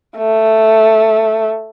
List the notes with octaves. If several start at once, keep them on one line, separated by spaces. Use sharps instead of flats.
A3